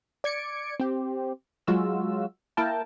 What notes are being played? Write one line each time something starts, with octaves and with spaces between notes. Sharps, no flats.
D5 G#6 C#7 D7
C4 G4
F#3 G#3 F4 F#4 E6
A#3 E4 A#4 G5 A5